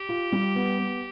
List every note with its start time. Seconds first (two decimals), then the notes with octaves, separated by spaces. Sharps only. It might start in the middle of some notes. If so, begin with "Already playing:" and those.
Already playing: G4
0.09 F4
0.32 G3
0.55 B3
0.79 B3